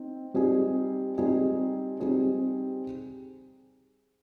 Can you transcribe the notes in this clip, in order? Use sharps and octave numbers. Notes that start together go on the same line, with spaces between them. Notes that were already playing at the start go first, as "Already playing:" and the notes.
Already playing: C4 D#4
G3 C4 D#4 G#4
G3 C4 D#4 G#4
G3 C4 D#4 G#4